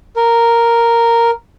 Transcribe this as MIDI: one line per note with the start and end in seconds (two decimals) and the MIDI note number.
0.16 1.31 70